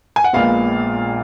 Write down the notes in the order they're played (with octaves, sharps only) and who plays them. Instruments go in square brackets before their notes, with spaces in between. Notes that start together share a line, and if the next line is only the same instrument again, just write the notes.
[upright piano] G#5
F#5
A#1 A#2 G#3 B3 F5